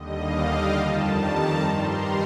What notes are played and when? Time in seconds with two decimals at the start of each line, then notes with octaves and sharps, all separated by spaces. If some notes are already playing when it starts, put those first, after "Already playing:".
Already playing: D#2 D3 G3 D#5
0.20 F5
0.48 G5
0.76 F2 D#3 G3 A5
1.19 A#5
1.60 G2 D#3 G3 C6
1.89 A#5